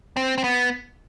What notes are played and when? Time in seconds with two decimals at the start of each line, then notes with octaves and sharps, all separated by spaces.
0.16 C4
0.38 C4
0.44 B3